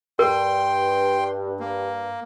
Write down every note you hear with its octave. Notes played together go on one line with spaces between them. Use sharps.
G2 A#4 G5 C6
A#3